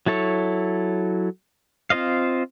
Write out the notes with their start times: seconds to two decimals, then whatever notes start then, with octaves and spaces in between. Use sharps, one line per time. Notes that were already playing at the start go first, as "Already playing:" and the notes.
0.06 F#3 E4 A4 C#5
1.90 C4 F4 C5 D#5 F5